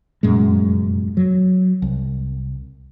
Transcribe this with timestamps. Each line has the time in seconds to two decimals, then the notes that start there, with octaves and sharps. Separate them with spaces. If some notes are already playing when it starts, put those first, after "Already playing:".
0.23 F1 F#2 A#2 G#3
1.17 F#3
1.82 C2